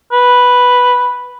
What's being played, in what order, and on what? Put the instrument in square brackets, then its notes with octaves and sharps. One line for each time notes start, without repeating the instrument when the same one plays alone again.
[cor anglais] B4